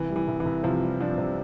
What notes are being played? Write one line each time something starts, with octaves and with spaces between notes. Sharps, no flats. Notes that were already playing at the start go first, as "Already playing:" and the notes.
Already playing: C2 E3
G3
E3
C2
E3
C2
C3 F3
G3
F3 D4
C3